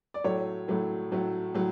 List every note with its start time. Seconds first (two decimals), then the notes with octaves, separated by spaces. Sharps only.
0.14 D5
0.24 A2 F#3 A3 C#5
0.68 A2 F#3 A3
1.11 A2 F#3 A3
1.54 A2 F#3